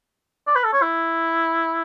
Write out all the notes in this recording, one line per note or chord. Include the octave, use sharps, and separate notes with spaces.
D5
B4
A4
C#5
E4